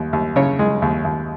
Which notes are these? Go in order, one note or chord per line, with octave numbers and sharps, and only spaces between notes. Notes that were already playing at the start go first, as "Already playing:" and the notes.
Already playing: D#2
D#2
C#3 C#5
G#3
D#2
D#2